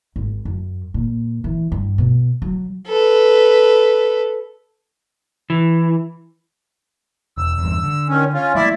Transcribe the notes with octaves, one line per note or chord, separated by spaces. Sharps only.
G#1
F#2
A#2
E3
G2
B2
F#3
A4 B4
E3
E1 E6
E2 G2
D3
D#3 C#4
C#4 F4
F#3 A3 A#3 E4 D5 E5